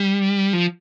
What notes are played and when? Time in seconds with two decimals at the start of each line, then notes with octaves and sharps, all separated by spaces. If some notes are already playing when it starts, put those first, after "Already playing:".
Already playing: G3
0.53 F3